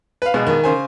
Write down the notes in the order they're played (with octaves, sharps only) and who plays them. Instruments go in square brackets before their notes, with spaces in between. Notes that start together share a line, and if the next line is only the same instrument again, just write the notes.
[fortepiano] B4 F5
A#1 B2 G#3
[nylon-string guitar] D#3
[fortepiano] C#3 C5 G#5